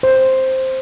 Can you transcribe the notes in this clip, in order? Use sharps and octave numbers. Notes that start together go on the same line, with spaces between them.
C5